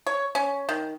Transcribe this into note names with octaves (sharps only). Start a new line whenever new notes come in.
C#5
C#4
D#3